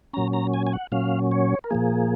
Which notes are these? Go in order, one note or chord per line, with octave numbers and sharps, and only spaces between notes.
A#2 F#3 C#4 A#5
A#5
G#5
G#5
F#5
A#2 F#3 C#4 F5
C#5
A#4
A#2 F3 A#3 G#4